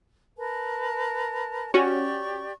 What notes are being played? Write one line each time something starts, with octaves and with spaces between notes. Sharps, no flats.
A#4 B4 A5
C#4 F#4 G4 D5 C#6